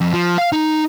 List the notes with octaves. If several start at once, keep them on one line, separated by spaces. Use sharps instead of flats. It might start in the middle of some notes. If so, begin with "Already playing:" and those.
F2
F3
F5
D#4